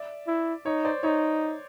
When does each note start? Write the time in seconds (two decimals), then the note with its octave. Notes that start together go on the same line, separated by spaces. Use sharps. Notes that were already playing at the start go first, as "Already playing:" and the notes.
Already playing: D5 E5
0.27 E4
0.65 D#4 C#5
0.85 C5 D5
1.03 D#4 C#5